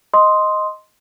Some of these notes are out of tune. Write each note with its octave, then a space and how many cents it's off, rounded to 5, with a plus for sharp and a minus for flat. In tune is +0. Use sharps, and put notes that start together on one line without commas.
D#5 +0 C6 +0 D#6 +0